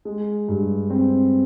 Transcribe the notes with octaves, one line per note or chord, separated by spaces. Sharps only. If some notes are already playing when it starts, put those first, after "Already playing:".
G#3
G2
C4